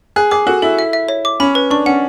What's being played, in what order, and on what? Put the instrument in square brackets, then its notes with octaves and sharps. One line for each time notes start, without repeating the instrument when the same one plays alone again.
[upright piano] G#4 [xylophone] F#6
[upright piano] G#4 [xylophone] D6
[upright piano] F#4 [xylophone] A4
[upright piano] E4 [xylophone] A4
[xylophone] E5
E5
C#5
D6
[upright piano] C#4 [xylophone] B5
[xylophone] B4
[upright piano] D4 [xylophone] C#6
[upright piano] C#4 [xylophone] F#5